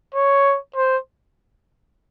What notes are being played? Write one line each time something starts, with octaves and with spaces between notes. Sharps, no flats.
C#5
C5